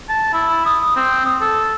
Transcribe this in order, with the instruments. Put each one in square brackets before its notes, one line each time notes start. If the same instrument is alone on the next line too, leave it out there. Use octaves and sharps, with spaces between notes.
[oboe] A5
E4
D#6
C4
D#6
A4